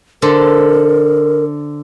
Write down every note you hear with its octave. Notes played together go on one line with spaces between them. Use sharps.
D3 A4 A#4 C5